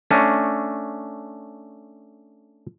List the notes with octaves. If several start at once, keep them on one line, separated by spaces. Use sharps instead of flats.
A3 C#4 D4